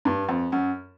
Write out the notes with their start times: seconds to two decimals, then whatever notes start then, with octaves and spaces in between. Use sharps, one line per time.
0.05 G2
0.29 F2
0.52 F#2